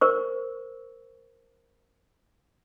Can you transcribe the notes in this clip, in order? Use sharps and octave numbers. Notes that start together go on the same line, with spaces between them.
A#4 C5 C#6